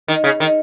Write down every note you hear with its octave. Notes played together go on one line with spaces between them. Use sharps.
D#3
C#3
D#3